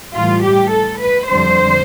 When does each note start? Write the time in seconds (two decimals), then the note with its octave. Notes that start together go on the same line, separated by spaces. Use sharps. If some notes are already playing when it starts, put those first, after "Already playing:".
0.14 A2 E3 G3 F4
0.43 G4
0.71 A4
1.00 B4
1.28 F2 D3 G3 C5